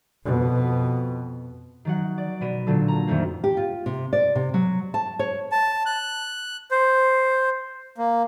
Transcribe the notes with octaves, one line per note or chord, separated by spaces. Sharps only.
F2 B2
D#3 F#3 F#5
D5
B2 B3 D#7
A#2 D3 F#3 A4
A#5
F2 D#3 A3 A#3 C4
G4
F4
C3
D5
C3
F#3
A5
C#5
A5
F#6
C5
A#3